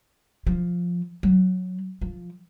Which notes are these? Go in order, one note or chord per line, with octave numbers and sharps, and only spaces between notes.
F3
F#3
F3